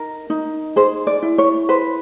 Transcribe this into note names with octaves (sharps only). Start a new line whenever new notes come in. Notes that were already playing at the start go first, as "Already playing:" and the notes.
Already playing: D#4 A#4
D#4
G#4 C5
D5
E4
C#5
B4 C5